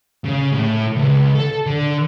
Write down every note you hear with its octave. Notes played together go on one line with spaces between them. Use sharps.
C#3
A2
C#2
A4
D3